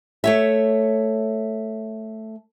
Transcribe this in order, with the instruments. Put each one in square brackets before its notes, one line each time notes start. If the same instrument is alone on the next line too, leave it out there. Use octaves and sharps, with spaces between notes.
[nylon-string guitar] A3 C#5 E5